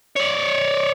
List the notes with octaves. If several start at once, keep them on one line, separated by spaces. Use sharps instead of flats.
C#5 D5